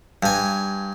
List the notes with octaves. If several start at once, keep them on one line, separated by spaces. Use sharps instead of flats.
G2 G#5